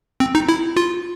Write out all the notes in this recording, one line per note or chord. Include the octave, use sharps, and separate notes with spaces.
C4
D#4
E4
F4